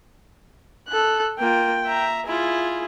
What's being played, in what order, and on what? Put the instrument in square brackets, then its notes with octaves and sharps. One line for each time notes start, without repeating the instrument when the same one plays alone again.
[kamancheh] A4 F#6
[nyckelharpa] A#3 F4 [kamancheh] G5
[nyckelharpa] E5 A#5
[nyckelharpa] E4 F4 [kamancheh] G#4